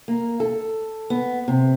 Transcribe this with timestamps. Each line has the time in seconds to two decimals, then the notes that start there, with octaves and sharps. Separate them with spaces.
0.08 A#3
0.40 A4
1.10 B3
1.48 C3